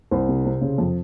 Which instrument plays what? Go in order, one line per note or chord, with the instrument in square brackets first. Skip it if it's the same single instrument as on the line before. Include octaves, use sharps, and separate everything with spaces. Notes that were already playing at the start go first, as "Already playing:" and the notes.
[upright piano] C2 C5
C3
C3
C#3
F2